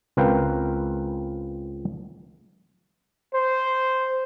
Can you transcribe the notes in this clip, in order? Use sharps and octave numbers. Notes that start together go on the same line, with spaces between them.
C#2 C4 A#4 B4 F5 G5
C5